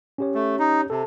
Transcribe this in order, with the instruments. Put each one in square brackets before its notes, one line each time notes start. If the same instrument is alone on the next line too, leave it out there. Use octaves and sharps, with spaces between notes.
[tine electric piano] C#4 G4 C#5
[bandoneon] A3
D#4
[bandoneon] C3 [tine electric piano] A4 A5